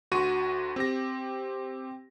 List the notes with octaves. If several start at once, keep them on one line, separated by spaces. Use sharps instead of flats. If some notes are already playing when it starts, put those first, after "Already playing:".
D2 F#4 C6 C#6 D#7
C4 G4 A#6